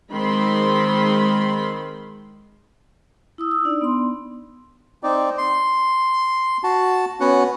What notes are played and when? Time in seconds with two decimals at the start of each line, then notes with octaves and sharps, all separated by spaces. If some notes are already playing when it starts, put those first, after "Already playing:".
0.11 D#3 G#3 C4 B5 C6
3.38 E4 D#6 E6
3.51 E6
3.65 D4 D#4 D5
3.81 B3 C6
5.03 C4 D#4 D5
5.38 C6
6.64 F#4 A5
7.20 B3 C#4 F#4 F#5